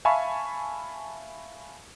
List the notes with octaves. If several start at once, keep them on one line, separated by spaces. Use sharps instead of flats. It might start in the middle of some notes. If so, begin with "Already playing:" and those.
E5 F5 G#5 A5 B5 C#6